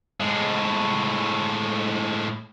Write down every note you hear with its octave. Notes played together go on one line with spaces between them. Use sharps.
A2 G#3